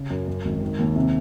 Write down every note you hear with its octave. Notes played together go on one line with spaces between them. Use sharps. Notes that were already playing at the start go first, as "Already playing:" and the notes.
Already playing: C#3
F#2
F#2
G#1
D#3
D#2
C3